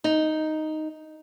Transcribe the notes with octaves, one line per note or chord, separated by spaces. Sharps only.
D#4